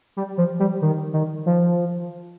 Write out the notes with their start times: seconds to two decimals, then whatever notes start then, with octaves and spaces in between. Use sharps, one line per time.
0.17 G3
0.37 F3
0.60 G3
0.82 D#3
1.13 D#3
1.46 F3